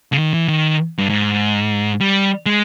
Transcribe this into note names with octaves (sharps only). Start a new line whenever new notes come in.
C#3
D#3
E3
D#3
G2
G#2
G3
G#3